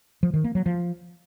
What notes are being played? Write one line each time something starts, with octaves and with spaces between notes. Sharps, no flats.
F3
D#3
A#3
F#3
F3